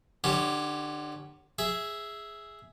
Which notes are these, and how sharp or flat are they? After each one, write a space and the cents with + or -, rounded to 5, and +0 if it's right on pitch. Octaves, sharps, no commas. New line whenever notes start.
D3 +30 C#4 +0 G4 +0
G#4 +0 E5 +0